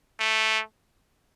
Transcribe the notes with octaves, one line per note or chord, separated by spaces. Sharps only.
A3